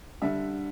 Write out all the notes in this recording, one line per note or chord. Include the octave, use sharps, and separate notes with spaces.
D3 G3 E5